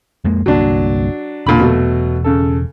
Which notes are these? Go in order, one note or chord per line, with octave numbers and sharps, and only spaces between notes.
F2 G#3 A#3
G1 C2 F#3 A#3 D4
E1 A#2 D3 B5
B2 F#3 A3
C#3 A4